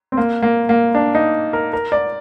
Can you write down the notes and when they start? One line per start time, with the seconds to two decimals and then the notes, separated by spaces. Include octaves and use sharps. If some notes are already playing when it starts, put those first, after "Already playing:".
0.12 C4
0.17 A#3
0.42 A#3
0.69 A#3
0.95 D4
1.15 D#4
1.53 A#4
1.73 A#4
1.92 D5